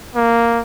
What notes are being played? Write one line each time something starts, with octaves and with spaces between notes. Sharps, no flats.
A#3